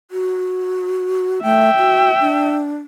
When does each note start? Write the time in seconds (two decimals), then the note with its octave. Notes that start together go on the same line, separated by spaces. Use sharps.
0.11 F#4
1.43 A3 E5 G5
1.78 F#4
2.20 D4